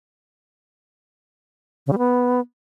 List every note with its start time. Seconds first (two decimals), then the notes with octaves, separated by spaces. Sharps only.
1.87 C#3
1.93 G3
1.98 B3